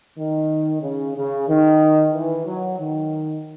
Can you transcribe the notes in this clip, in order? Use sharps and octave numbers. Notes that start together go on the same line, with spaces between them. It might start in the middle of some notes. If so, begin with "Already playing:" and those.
D#3
C#3
C#3
D#3
E3
F#3
D#3